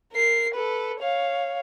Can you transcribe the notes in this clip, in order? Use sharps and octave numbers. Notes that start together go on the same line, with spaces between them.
A#4 C7
A4 B4
C#5 F5